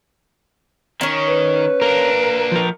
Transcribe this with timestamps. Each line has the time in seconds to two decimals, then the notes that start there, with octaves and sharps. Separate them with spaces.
1.01 D#3 C#4 C#5
1.27 B4
1.82 A#3 D4 A#4
2.52 F3 A#4